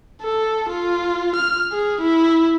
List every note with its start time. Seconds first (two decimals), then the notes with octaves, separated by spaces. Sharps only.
0.22 A4
0.70 F4
1.36 F6
1.72 G#4
2.01 E4